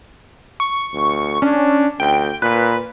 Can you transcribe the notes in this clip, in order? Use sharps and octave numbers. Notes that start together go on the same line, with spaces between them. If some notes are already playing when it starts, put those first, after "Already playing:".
C#6
D2
C#4 D4
D2 G5
A#2 B4